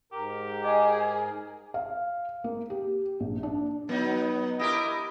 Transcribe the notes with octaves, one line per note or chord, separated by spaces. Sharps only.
G#2 G4 A#4
G#4 D#5
F5
A#3
G4
A#1
D4
F#3 B3 D#4
E4 G4 A#4 D#5